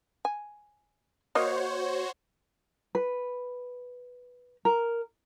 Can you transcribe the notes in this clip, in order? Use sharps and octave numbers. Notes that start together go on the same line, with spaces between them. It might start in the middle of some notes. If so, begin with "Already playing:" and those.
G#5
A#3 F#4 C5 C#5 D#5
B4
A#4